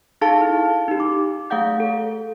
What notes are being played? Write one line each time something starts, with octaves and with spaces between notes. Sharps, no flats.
D#4 G#4 A4 F5 A5
E4 F5
D#4 G4
D6
A3 G#4 F5 F#5 G6
A4